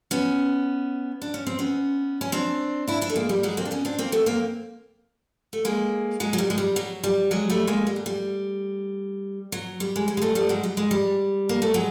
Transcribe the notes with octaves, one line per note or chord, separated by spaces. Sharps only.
B3 C#4
D4
C#4
C4
B3 C#4
C#4
C4 D4
D4 E4
D4 E4
A3
G#3 A#3
G3
F#3 G#3
A#3 C4
D4
B3 C#4
C4 D4
A#3 C4
A3 B3
A#3 C4
A3
G#3 A#3
F#3 G#3
F#3
G3
G#3
G3
F#3
G3
F#3 G#3
G3 A3
G#3 A#3
G3
F#3
G3
F#3
G3
G#3
G3
G#3
G3 A3
G3 A3
F#3 G#3
G3
G#3
G3
A#3
A3
F#3 G#3